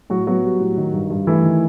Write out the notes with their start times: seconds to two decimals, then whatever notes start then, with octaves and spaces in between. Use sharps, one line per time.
0.10 A2 F#3 F#4
0.27 F#3 B3 F#4
0.44 G3
0.60 A2
0.78 D#3
0.94 G2
1.10 G2
1.27 E3 A3 E4
1.43 D#3